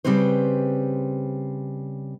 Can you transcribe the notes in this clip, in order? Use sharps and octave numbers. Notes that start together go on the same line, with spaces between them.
C#3 G3 C4 B4 C5